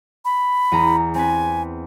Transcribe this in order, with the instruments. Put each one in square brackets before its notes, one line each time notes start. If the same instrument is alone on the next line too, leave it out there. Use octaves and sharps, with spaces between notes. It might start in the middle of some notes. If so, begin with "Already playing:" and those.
[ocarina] B5
[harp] E2 G#4 A#5
[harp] C4 B4 [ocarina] G#5